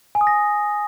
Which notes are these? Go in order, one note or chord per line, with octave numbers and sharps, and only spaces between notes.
G#5
D#6
A#6